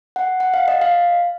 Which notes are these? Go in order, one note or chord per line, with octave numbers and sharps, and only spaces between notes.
F#5
F#5
F5
D#5
F5